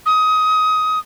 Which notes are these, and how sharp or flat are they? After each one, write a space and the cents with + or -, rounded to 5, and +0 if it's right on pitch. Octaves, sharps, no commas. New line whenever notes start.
D#6 +20